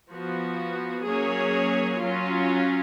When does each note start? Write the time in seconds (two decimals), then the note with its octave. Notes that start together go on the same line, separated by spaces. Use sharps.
0.11 F3 B3 F#4
1.06 F#3 A#3 C#4 G#4 C#5
2.01 F#3 C#4 F4